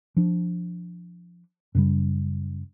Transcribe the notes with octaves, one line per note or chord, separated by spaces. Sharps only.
F3 D4
F#2 C#3 G3